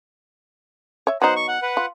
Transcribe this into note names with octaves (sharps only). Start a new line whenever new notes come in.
C#5 E5
F#3 B3 D#4 C5 F#5
C#6
F#5
B4 F#5
F4